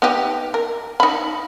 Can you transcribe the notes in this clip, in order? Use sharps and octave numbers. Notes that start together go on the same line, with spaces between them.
B3 D#4 G4
A#4
D#4 B5